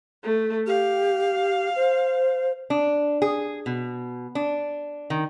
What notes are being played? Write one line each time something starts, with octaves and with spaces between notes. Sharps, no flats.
A3
G4 F5
C5
D4
G#4
B2
D4
D#3